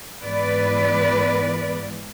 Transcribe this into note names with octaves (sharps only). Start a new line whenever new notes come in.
G#2 E3 B3 B4 D5